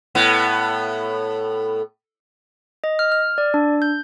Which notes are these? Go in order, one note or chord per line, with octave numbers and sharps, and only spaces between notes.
A2 B3
D#5
F6
F6
D5
D4
G6